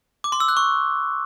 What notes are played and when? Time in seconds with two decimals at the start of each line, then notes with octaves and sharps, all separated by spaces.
0.24 D6
0.32 C6
0.40 E6
0.49 F#6
0.57 C#6